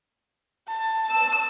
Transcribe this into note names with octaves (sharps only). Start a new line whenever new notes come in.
A5
E6